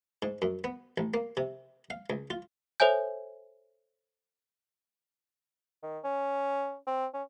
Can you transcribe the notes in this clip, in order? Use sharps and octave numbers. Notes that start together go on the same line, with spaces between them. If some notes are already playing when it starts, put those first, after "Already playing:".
G#2
F#2
B3
A1
A#3
C3
F5
C#2
F4
A4 C5 C#5 E5 G#5 G6
D#3
C#4
C4
C#4